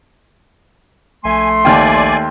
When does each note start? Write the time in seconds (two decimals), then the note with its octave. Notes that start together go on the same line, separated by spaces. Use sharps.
1.24 A#1 A3 G#5 C6
1.65 D#2 D5 G5 G#5